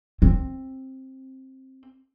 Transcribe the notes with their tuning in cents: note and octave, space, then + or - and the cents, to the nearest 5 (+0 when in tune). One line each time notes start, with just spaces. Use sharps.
C4 +15